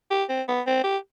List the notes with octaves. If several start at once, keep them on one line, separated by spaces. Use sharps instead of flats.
G4
C4
B3
C4
G4